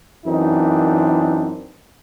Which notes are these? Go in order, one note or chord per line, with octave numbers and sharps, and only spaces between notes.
F#2 E3 C4 D4 D#4